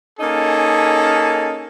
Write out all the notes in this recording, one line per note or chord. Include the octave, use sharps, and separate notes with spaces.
A#3 C#4 D#4 G#4 A4